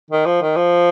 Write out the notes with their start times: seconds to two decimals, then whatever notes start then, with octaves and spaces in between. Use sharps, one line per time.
0.10 D#3
0.26 F3
0.42 D#3
0.56 F3